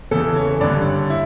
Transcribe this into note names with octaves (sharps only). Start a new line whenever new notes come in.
E2 C#3 E3 A4
C#5
G2 D3 D5
E4